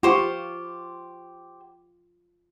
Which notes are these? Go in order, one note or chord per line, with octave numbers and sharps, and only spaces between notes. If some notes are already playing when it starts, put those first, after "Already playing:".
F4 G4 C5 C#6